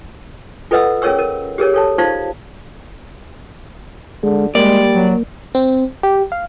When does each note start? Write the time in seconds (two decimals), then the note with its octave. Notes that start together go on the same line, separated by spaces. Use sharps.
0.71 F4 A4 B4 D#5 F#5 E6
1.02 C#4 G#4 A#4 C#5 C#6 E6
1.19 A#4
1.58 G4 G#4 A#4 C#5
1.74 A4 C#5 A5
1.98 D#4 F4 C5 F5 A5 C#6
4.23 D3 G#3
4.55 G3 G#3 A#3 D5
4.92 F#3
5.55 C4
6.03 G4
6.32 F5